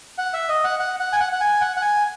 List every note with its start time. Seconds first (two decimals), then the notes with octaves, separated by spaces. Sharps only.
0.18 F#5
0.33 E5
0.49 D#5
0.64 F#5
0.79 F#5
1.00 F#5
1.13 G#5
1.20 F#5
1.32 F#5
1.41 G#5
1.61 F#5
1.77 F#5
1.82 G#5